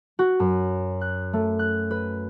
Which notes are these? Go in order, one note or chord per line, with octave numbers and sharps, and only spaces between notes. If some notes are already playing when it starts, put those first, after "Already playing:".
F#4
F#2
F#6
A3
F#6
B4